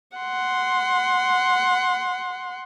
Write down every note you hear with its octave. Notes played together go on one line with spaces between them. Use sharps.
F#5 C6